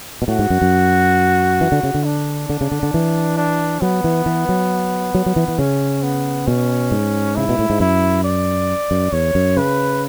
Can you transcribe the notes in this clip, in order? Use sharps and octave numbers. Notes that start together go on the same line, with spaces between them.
B2
A2 F#4
G#2
F#2
F#2
E3
D3
C#3
D3
D4
D3
C#3
D3
D3
E3
D4
F#3 B3
E3
E3
F#3
F#3
F#3
E3
E3
C#3 C#4
B3
B2 C#4
G#2
C#3 E4
B2
A2
G#2
F#2 E4
D5
F#2
E2 C#5
F#2
C#3 B4